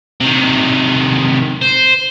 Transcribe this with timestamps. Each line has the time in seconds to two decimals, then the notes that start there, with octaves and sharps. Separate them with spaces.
0.20 C3 D#3
1.62 C5